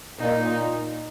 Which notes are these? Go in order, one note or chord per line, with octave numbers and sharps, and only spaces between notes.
A#2 D#4